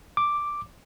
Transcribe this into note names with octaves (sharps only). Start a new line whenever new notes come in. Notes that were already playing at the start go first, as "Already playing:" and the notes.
D6